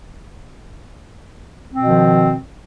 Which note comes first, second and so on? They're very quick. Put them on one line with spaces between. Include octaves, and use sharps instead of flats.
C4 B2 F3 D#3